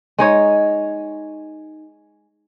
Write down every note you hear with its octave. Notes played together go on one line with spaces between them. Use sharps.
G#3 D#4 C#5